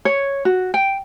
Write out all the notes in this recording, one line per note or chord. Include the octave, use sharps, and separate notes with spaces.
C#5
F#4
G5